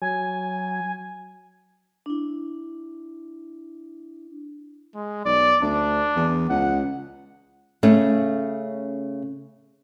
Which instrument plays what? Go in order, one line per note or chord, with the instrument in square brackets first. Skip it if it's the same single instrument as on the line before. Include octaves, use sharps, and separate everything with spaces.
[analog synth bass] F#3 [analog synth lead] G#5
[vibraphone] D4 E4
[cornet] G#3
[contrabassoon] B1 [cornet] D5
[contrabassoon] D2 [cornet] D4
[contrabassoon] E2
[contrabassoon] C#2 [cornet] F#5
[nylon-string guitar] C#3 A3 C#4